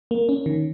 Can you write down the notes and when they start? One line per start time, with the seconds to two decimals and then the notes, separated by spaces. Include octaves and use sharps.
0.11 A#3
0.29 C#4
0.46 D#3